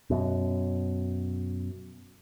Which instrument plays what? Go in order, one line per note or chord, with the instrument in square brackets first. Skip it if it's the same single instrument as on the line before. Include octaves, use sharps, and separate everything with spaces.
[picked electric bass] F#2 B2